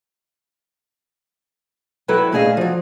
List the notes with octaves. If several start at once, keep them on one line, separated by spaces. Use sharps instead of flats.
F#3 E4 A4 B4 G5
A#2 A3 D4 G#4 D#5 F5
F3 F#3